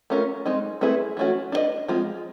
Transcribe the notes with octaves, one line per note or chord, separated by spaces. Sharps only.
A3 C#4 F4 A#4
G#3 C4 D#4
A3 C4 E4 G#4 B4
E3 A3 C#4 F#4
D4 F#4 B4 D#5
F3 G#3 C4 F4